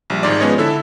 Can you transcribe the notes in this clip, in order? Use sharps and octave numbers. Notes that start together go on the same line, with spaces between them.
A#1 G3
G#1 G#2 D5
F3 G#3 B3 C#4 C#5 D#5
D3 E4 A4 E5